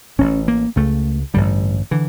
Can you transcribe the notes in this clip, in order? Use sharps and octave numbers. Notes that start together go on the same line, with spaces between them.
A1 A2 C#4
A#3
C#2 C#3 A3
A1 G2 D3 G3
D3 E3